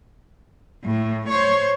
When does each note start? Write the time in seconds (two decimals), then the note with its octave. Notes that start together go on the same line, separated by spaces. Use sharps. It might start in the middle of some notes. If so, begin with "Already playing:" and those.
0.84 A2
1.28 C5 C#5